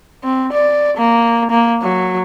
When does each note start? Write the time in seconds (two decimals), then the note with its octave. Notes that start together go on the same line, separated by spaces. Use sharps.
0.24 C4
0.52 D5
0.97 A#3
1.51 A#3
1.82 F#3